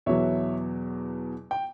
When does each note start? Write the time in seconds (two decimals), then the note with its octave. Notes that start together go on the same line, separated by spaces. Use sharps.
0.06 E2 B2 F#3 C#5 E5
1.51 G5